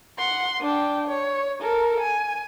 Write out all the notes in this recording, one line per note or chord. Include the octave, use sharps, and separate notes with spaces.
F#5 C6
D4 G5
C#5
A4 A#4
G#5